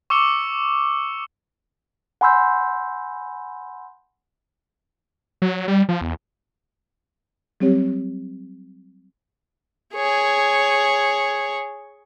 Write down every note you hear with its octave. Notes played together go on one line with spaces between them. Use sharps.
C#6 D6 E6 C#7 G7
F#5 G#5 B5 C6 E6 G6
F#3
G3
F3
E2
F#3 G3 C4 G4 C#5
G#4 C#5